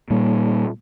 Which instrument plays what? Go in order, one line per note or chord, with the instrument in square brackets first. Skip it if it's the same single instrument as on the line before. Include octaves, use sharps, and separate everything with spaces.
[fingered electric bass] A#2 G3 A#3